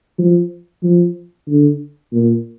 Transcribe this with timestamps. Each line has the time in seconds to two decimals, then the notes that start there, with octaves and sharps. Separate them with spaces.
0.19 F3
0.83 F3
1.48 D3
2.12 A#2